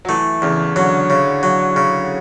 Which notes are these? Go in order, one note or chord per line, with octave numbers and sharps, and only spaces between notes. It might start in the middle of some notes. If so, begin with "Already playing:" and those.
F#3
E3 A3
E2 C#3
D3 F#3
C#3
F#3
C#3